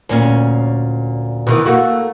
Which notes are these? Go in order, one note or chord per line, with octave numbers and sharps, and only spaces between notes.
D2 A#2 C#4
B2 D#3 E3
A3 A#3 F#4